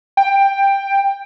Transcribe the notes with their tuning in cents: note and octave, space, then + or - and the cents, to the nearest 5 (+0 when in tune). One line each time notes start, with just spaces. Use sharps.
G5 +10